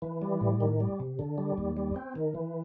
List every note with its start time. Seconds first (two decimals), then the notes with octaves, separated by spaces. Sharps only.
0.02 E3
0.22 G3
0.41 A2
0.60 D#3
0.80 G3
1.00 C3
1.19 D3
1.38 G3
1.58 D#2
1.77 G3
1.96 C4
2.16 D#3
2.35 E3